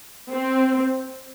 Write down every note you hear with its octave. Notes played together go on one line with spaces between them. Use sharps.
C4